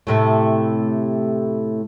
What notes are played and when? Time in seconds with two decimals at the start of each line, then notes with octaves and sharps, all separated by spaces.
0.07 A2 C3 A3